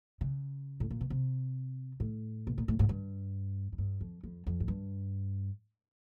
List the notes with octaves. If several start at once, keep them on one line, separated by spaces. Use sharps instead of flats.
C#3
A2
A#2
B2
C3
A2
B2
A#2
A2
G#2
G2
G#2
G2
F2
F2
F2
G#2
G2